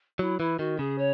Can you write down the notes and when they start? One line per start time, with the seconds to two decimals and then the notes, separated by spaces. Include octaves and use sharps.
0.19 F#3 E4
0.39 E3 E4
0.59 D#3 F#4
0.78 C#3 G#4
0.98 C#5